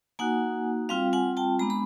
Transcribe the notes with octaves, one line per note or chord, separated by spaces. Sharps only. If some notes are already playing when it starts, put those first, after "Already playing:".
A#3 D#4 F#4 F#5 G#5
G3 C4 F4 F5 G5
F#5 G#5
G5 A5
G#3 B3 D4 A#5
B5